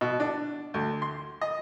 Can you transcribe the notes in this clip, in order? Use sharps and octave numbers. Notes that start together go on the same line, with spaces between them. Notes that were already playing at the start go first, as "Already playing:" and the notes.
B2
D4
D2
C6
D#5